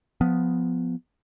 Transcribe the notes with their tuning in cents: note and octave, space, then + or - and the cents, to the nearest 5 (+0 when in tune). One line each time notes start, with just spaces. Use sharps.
F3 +20 B3 +10